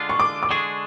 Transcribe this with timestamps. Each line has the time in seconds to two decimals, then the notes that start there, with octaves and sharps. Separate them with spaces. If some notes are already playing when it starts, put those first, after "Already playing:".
Already playing: D3 G#3 D4 F4
0.09 C#6
0.20 D6
0.43 D6
0.49 D3 G#3 D4 G#4 C#6